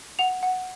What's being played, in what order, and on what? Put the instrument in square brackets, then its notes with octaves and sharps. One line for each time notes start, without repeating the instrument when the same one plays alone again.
[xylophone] F#5 F7
F#5